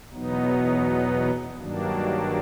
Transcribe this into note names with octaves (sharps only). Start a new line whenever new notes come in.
E2 B2 F#3 B3 D#4
G2 D#3 F#3 A#3 D4